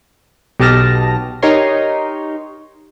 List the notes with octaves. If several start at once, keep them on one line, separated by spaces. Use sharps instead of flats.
B1 G4 D#5 A5 F6 A#6
D#4 G4 A#4 C#5 C6